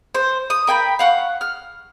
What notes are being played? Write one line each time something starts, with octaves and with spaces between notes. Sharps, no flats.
C5
D#6
A#4 G5 G#5 B5
F5 F#5 C#6
F6